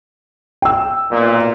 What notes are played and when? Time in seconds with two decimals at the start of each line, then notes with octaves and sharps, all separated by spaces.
0.62 G5 E6
1.11 B1 A#2